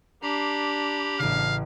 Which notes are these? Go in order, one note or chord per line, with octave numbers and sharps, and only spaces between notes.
D4 G4 A#5 B5 C7
A1 C#3 F5